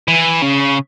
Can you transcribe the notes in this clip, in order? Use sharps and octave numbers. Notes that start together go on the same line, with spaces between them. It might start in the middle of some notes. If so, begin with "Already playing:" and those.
E3
C#3